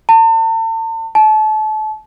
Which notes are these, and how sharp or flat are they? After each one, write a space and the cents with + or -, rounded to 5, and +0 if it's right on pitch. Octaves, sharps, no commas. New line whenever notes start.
A5 +40
A5 -30